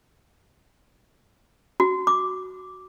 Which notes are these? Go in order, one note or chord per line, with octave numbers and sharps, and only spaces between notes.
F#4
D6